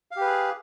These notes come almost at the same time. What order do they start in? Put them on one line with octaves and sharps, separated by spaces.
F5 G4 B4 G#4